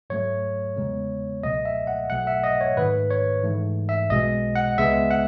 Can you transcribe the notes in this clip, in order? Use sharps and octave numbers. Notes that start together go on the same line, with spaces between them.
G#2 F#3 A3 C#5
E2 C#3 G#3 B3
C#2 B2 F#3 A3 D#5
E5
F#5
B1 B2 F#3 A3 F#5
E5
D#5
C#5
G#2 D#3 A3 B4
C#5
G#2 E3 A3
E5
B1 B2 G#3 D#5
F#5
C#2 C#3 G#3 B3 E5
F#5